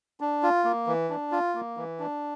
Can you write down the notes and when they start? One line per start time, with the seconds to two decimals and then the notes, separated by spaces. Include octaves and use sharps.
0.20 D4
0.43 F4
0.64 A#3
0.87 E3
1.10 D4
1.32 F4
1.55 A#3
1.77 E3
2.00 D4